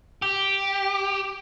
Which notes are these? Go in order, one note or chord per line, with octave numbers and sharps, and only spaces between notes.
G4